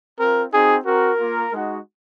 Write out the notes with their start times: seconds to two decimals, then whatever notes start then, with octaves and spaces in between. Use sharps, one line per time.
0.19 C4 F4 A#4
0.52 C4 D#4 F#4 G#4
0.85 C4 F#4 A#4
1.20 A#3 F4
1.52 G#3 D#4 F#4